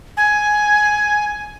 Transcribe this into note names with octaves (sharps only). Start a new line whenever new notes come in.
G#5